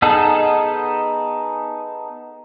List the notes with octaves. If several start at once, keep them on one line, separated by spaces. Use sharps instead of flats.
B3 D#4 G#4 A4